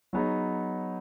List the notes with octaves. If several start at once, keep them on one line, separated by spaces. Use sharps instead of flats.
F#3 B3 D#4 G#4 C#5